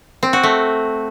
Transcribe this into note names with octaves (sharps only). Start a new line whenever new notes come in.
C4
F#4
A3